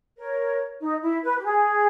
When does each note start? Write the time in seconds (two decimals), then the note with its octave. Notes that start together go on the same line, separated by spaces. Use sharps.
0.17 A#4 C#5
0.80 D#4
1.02 E4
1.23 B4
1.38 G4
1.43 G#4